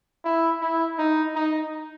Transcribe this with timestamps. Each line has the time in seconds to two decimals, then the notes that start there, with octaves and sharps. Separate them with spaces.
0.24 E4
0.61 E4
0.98 D#4
1.35 D#4